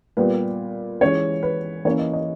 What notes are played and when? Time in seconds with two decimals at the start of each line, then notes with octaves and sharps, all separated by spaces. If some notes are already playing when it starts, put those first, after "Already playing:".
0.17 A#2 G3 B3 B4
1.01 E3 G#3 C#4 C#5
1.43 B4
1.85 E3 A#3 C#4 C#5
1.99 D#5
2.13 D#5